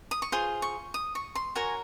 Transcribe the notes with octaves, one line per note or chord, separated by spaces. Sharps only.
D#6
C#6
F4 G#4 C5 C6
C#6
D#6
C#6
C6
F#4 A#4 C#5 G#5